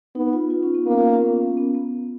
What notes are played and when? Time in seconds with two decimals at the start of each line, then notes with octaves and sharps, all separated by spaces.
0.15 B3 D#4
0.33 F4
0.50 F4
0.63 C#4
0.74 B3
0.86 A#3 B3
0.98 F4
1.10 C#4
1.22 B3
1.57 B3
1.75 B3